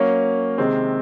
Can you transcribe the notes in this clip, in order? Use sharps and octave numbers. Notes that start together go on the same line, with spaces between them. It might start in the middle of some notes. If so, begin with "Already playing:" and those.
Already playing: F#3 A#3 C#4
C3 D#3 G#3 C4